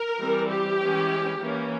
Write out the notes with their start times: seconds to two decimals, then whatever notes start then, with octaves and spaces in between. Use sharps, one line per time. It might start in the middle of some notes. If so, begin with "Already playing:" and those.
Already playing: A#4
0.19 E3 G3 C4
0.48 G4
0.79 E3 G#3 C#4
1.39 E3 A#3 C#4